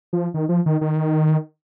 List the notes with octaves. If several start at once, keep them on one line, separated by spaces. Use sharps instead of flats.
F3
D#3
F3
D#3
D#3